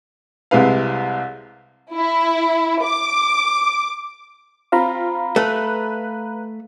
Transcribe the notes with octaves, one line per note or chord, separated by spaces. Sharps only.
C2 C3 G#3 E4 B4 F5
E4
D6
C4 F4 F5 A#5 B5
A3 B4